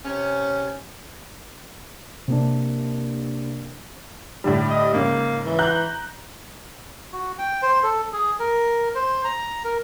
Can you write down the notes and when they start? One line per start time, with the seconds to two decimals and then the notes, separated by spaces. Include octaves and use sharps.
0.05 C3 C#4
2.28 C3 A#3 D4
4.44 A2 D3 G3
4.70 D#5
4.94 G#2 C#3 A#3
5.46 E3
5.59 A#5 F#6 G6
7.13 F#4
7.39 G5
7.62 C5
7.83 A4
8.13 G#4
8.39 A#4
8.95 C5
9.24 A#5
9.65 A#4